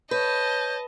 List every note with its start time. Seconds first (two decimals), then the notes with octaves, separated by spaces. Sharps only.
0.11 B4 C#5 D#5 A5 G6